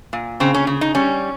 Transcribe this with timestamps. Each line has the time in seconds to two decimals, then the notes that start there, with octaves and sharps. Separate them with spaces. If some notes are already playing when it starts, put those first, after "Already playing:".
0.13 A#2
0.40 C#3 C4
0.54 C#4
0.67 C#3
0.81 D#4
0.95 G3 C#4